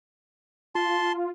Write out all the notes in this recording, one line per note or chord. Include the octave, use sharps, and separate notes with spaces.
F4 A5 C6